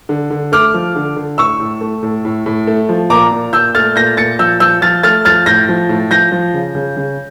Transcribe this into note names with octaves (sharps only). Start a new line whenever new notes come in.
D3
D3
A3 D6 F6
F3
D3
D3
A2 C#6 E6
A2
A3
A2
A2
A2
A3
F3
A#2 A#5 D6
A#2
A#2 E6 G6
A3 F6 A6
A#2 G6 A#6
A#2 A6 C#7
F3 E6 G6
F3 E6 G6
F3 F6 A6
A3 F6 A6
F3 F6 A6
A2 G6 A#6
F3
A2
F3 G6 A#6
F3
C#3
C#3
C#3